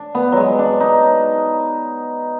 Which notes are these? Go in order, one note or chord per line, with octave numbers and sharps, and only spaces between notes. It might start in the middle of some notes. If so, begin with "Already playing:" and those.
Already playing: D4
B3
F#3 G#3
D4
D#4